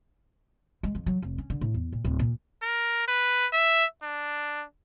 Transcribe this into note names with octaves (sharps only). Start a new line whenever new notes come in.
G#3
F2
F#3
F1
C#4
D3
A2
E2
A#2
D1
A#2
A#4
B4
E5
D4